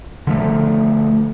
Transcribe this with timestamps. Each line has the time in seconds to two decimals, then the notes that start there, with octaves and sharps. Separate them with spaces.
0.27 D3 F3 A3